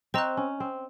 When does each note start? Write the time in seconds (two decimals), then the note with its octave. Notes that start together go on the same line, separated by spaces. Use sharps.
0.14 C4 C5 D#5 A#5 C#6 F#6
0.37 C#4
0.60 C4